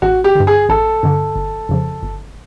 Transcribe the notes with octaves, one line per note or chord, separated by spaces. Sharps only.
A1 F#4
G4
G2 D3
G#4
A1 A4
G2 D3
G1
F2 C#3 F3
G1